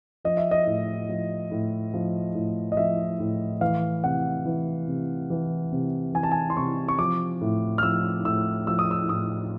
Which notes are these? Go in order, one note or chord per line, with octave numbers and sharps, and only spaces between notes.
F3 D#5
E5
D#5
A2
F3
A2
F3
A2
D#5
F3 E5
A2
E3 F5
C3 F#5
E3
C3
E3
C3
E3 G#5
A5
G#5
C6
C3 C#6
C#6
F3 D6
A2
F6
F3 E6
A2 E6
F3 E6
D#6
E6
A2 D#6